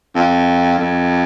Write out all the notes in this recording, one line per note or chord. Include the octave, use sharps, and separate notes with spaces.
F2
F2